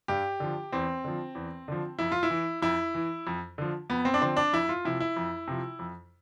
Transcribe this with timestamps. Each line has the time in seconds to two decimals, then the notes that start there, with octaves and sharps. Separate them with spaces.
0.08 G2 G4
0.40 D3 F3
0.72 E2 C4
1.04 D3 F3
1.35 E2
1.68 D3 F3
1.99 F2 E4
2.12 F4
2.23 E4
2.30 E3
2.62 F2 E4
2.94 E3
3.27 F2
3.58 D3 F3
3.90 F2 B3
4.05 C4
4.14 D4
4.21 D3 F3 C4
4.37 D4
4.53 F2 E4
4.69 F4
4.85 C3 F3 E4
5.00 E4
5.16 F2
5.48 C3 F3
5.79 F2